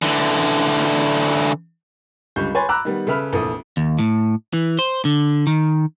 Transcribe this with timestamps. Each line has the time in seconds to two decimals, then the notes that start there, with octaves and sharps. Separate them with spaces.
0.02 D3 E3
2.36 C#2 D3 G3 C#6 G6
2.54 B4 C#5 G#5 B5 C6 A6
2.69 A#5 B5 D6 E6 F#6
2.85 D#3 G3 B3
3.07 C#3 A4 B4 E5 B5 F6
3.32 F1 A#1 E3 A4 D#6
3.77 D#2
3.99 A2
4.53 E3
4.79 C5
5.05 D3
5.47 D#3